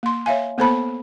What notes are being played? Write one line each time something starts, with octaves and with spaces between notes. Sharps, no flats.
A#3 C6
C#5 E5 F5 G#5
A#3 B3 A4 C5 A5 B5